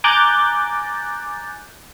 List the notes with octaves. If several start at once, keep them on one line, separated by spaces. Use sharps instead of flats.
G#5 A#5 D6 F#6 G6 A6